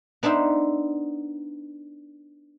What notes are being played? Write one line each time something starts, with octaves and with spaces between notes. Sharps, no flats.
B3 D4 D#4 C5 E5